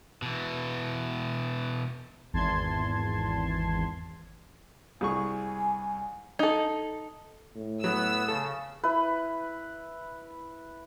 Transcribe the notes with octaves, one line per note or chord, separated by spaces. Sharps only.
B2 E3
G#1 E2 A5 C6 G#6
C2 G#4 G#5 C#6
D#4 A4
A2
F#3 B3 E6
C#3 A4
E4 B4